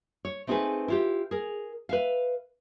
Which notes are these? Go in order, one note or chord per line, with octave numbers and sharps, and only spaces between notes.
C#5
A3 C4 D#4 F#4 G#4 B4
E4 F4 G4
G#4 A#4
B4 E5 F5